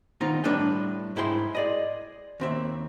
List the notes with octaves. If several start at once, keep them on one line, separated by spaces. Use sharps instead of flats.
D#3 B3 C4 D#4 F4
A2 G3 D4 A4 B4 G5
G#2 E4 G#4 G5 C6
G#4 D5 D#5
D#2 C4 E5